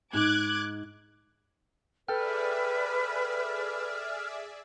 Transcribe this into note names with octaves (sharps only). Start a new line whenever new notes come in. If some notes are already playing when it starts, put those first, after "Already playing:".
G#2 D6 F#6 G#6
G#4 A4 B4 D5 E5 G5 F6